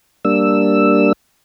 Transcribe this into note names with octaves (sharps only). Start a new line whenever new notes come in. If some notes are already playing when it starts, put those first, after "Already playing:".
G3 A#3 D4 E6